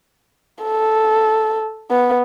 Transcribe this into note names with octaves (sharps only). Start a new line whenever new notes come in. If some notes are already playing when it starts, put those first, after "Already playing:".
A4
B3